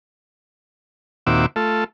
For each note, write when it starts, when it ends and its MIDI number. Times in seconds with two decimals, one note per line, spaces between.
1.27 1.46 39
1.27 1.46 46
1.27 1.46 60
1.27 1.46 66
1.27 1.46 76
1.27 1.46 86
1.56 1.84 57
1.56 1.84 65
1.56 1.84 69